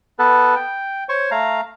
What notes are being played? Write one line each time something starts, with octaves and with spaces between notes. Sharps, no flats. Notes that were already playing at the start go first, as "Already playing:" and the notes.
B3 A4 B4
G5
C5 C#5 C#6
A3 F5 A#5